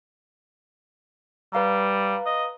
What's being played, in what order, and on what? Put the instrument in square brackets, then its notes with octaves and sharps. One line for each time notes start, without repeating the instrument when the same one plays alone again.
[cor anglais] G3 [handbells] B4 F5 A#5
[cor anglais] D#5